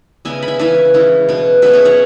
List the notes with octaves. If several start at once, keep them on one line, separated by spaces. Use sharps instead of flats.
C#3 G#3 B3 E5 G#5
B5
E5 G#5
C#3 E3 C#4 E5 G#5
E3 G#3 C#4
B2 B3
B2 F#3 C#4 B4 E5
G#4 C#5
C#5 F#5